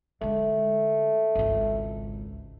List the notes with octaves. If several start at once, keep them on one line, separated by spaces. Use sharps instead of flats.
D3 G#3 A3
G#1 C#2